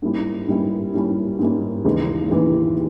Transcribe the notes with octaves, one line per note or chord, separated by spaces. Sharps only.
G#2 G3 A#3 C#4 E4
G#2 G3 A#3 C#4 E4
G#2 G3 A#3 C#4 E4
G#2 G3 A#3 C#4 E4
D#2 C#3 E3 G#3
D#2 C#3 E3 G#3